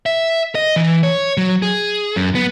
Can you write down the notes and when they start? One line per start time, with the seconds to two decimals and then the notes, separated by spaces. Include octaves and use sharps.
0.06 E5
0.55 D#5
0.76 E3
1.03 C#5
1.37 F#3
1.62 G#4
2.16 F#2
2.35 B3